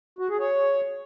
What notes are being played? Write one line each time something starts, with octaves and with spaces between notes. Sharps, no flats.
F#4
G#4
C#5